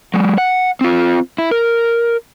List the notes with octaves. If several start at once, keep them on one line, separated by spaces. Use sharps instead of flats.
F#3 G#3
F#5
C4 F4
E4
A#4